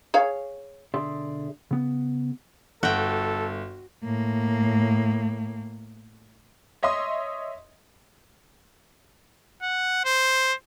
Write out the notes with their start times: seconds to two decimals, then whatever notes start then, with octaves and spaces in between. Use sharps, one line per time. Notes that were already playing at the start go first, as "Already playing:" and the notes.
0.14 G#4 C#5 F5
0.94 B1 D3 G#4 D5 E5 C6
1.71 C#3 B3
2.83 G1 F#4 A4 G5
4.04 A2 A#3
6.83 C#5 D#5 E5 C6 D#6
9.62 F#5
10.05 C5